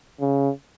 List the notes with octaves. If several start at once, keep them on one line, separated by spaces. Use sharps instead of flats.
C#3